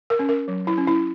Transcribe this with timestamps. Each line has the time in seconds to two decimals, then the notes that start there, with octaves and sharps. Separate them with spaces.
0.10 A#4
0.19 C#4
0.29 A#4
0.48 F#3
0.67 E4
0.78 C#4
0.87 E4